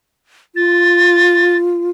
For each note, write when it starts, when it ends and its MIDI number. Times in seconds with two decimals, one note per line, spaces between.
0.56 1.90 65
0.56 1.56 93